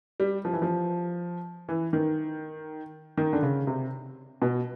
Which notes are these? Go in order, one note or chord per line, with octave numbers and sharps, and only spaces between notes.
G3
F3
E3
F3
E3
D#3
D#3
D3
C#3
C3
B2